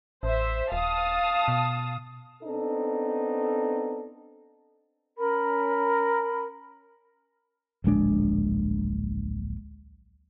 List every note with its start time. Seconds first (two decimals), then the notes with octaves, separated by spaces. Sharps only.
0.23 A1 C5 E5
0.72 D#1 F5 A5 D#6
1.48 B2
2.43 B3 C4 D4 D#4 A4
5.18 C#4 A#4 B5
7.84 D1 A#1 G#3 D4